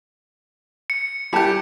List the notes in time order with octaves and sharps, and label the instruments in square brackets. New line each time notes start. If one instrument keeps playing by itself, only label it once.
[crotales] C#7
[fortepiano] G3 G4 [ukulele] E4 A5